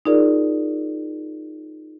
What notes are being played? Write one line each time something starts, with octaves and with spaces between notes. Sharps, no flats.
D#4 F4 G#4 A#4 D5